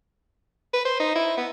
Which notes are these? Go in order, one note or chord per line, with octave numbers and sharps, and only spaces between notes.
B4
C5
D#4
E4
B3